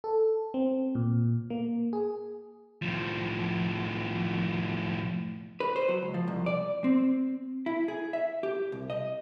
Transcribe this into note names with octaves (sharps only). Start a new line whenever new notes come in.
A4
C4
A#2
A#3
G#4
A2 F3
B4
C5
F#3
C#2
F3
C2
D5
C4
E4
G#4
E5
G4
C2
D#5